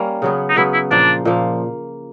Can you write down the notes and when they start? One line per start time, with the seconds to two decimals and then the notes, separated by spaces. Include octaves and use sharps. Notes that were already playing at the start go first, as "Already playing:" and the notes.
Already playing: G3 A#3 C#4
0.22 C#3 F#3 B3
0.50 D#4
0.56 C#3 F#3 B3 E4
0.74 E4
0.91 A#2 F3 A#3 D4
1.25 A#2 F3 A#3